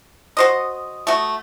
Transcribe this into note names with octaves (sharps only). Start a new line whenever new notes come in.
F#4 C5 D#5 D#6
A3 F#4